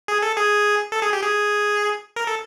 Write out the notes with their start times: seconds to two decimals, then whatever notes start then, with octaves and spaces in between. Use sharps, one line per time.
0.08 G#4
0.22 A4
0.37 G#4
0.92 A4
1.02 G#4
1.13 G4
1.23 G#4
2.16 A#4
2.27 A4